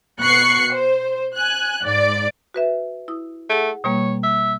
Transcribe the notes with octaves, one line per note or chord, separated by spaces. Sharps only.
B2 C#6 F#6 C7 C#7
C5
G#5 F#6
G#2 D5
F#4 B4 E5
E4 D#6
A3 G#4 F#5
B2 G3 A#3 C#5
E5